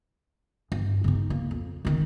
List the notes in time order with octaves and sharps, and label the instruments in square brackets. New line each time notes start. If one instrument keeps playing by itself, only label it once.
[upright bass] G2
C#3 D#4
A#3
F2
F#1 D#3